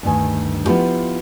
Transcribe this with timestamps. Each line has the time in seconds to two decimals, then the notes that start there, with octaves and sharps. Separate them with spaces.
0.03 D2 G2 D#3 G#5
0.65 F3 B3 E4 F4 G4